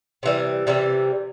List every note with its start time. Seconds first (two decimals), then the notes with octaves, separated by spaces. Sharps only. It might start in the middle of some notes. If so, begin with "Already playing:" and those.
0.23 C3 E3 G3
0.67 C3 E3 G3